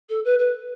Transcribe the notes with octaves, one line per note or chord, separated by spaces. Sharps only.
A4
B4
B4